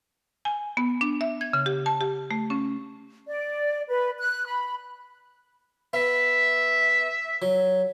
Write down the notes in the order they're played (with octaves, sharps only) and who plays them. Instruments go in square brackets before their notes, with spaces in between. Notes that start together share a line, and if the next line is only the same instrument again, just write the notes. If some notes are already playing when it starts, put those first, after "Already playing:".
[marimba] G#5
B3
D4
E5
G#6
C#3
G4
A5
G4
A3
C#4
[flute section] D5
B4
F#6
B5
[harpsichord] B3 [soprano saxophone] E5
[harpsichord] F#3